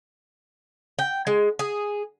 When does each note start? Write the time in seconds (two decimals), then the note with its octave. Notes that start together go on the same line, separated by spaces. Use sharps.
0.99 G5
1.27 G#3
1.59 G#4